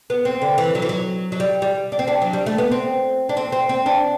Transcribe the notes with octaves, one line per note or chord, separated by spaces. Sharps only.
B3
C4
D3
E3
F#3
E3
F#3
F#3
G3
G3
D4
C4
D4
F#3
G3
A3
B3
C4
D4
C4
C4
C4
D4